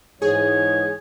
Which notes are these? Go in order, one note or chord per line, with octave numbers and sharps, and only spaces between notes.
G#2 E3 G#4 C#5